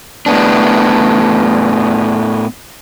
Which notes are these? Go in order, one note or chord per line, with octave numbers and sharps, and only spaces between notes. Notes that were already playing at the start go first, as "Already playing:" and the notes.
A2 B3 D4